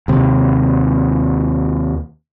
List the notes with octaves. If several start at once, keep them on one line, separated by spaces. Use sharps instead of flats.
D#2 C3